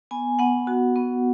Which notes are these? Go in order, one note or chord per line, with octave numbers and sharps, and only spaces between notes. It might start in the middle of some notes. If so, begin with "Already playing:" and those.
B3 G#5
B3 F#5
F#4
B3